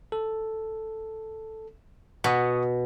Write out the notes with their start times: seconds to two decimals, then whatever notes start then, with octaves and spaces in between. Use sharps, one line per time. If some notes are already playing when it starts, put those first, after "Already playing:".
0.12 A4
2.24 B2 F#5 C#6 D#6